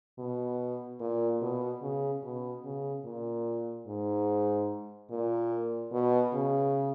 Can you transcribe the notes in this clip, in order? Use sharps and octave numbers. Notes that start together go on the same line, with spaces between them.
B2
A#2
B2
C#3
B2
C#3
A#2
G#2
A#2
B2
C#3